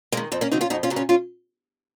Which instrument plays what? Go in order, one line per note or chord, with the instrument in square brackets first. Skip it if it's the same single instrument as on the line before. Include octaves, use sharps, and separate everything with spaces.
[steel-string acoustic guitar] D#3 G#3 A#3
F2 C4
A#3 C#4
C#3 F#3 C4 D#4
C#4 F4
F2 D#4 F#4
C#4 F4
C#3 F#3
C#4 F4
C#4 F4